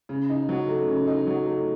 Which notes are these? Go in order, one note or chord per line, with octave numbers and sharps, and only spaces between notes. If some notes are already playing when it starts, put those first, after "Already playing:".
C#3
D#4
F#3
A3
C#3
D#4
F#3
A3